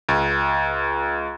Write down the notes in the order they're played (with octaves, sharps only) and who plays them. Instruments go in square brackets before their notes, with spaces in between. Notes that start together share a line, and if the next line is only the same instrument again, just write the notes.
[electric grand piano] C#2